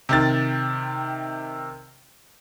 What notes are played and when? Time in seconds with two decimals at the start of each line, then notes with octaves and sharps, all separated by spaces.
0.09 C3 D#3 A6